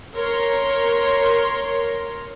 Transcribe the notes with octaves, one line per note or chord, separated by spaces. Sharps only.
A#4 C#5 C6